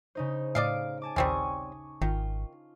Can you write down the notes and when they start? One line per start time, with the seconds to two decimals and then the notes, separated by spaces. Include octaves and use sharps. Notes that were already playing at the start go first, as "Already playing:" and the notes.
0.15 C#3 D#4 C5
0.55 A2 D5 D#5 F5 D7
1.02 G#5 A5 D6
1.16 A#1 D#2 G3 C4 C#4 G#5 C#6 D#6
2.02 G#1 D#3 F4